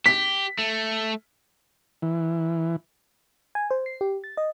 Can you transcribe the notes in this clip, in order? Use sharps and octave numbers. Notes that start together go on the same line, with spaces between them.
G4 B6
A3
E3
G#5
C5
C7
G4
A6
D#5